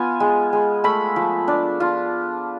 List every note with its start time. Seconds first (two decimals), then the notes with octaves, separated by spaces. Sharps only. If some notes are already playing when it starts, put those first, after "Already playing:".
Already playing: B3 F4 G#5
0.20 G#3
0.53 G#3
0.84 A3 B5
1.16 F3
1.48 D4
1.80 F4